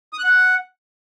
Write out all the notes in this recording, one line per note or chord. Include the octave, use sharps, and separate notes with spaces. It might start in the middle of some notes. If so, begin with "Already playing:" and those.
D#6
F#6
F#5